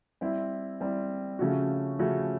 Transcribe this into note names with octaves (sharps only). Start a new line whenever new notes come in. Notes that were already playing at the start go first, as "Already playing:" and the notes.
G3 C4 E4
G3 C4 E4
C#3 F3 A3 C#4 F#4
C#3 F3 A3 C#4 F#4